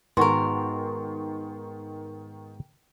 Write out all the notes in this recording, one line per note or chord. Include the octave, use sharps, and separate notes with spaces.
G#2 D#3 B3 F#4 A#4 G#5 C6 C#6